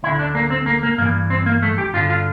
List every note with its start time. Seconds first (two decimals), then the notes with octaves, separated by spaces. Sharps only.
0.03 D2 D3 E4
0.19 D4
0.35 A#3
0.50 C4
0.66 A#3
0.83 A#3
0.98 G2 A#3
1.02 E3
1.30 C4
1.46 A#3
1.62 A3
1.78 G4
1.93 G2 D3 F4
2.10 F4